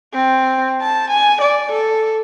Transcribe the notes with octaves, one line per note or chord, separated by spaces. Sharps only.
C4
A5
G#5
D5
A4